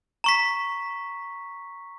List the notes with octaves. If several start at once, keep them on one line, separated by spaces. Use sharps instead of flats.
A#5 C#6 B6